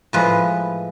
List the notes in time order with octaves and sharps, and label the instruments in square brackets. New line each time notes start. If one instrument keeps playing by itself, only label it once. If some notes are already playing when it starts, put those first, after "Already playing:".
[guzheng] A2 F3 G#3 B4